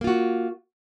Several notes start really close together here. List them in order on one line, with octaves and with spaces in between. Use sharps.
A#3 F4 F#4